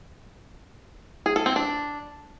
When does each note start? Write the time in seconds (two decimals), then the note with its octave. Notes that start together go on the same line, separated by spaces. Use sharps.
1.26 G#4
1.36 A4
1.46 C4
1.56 D4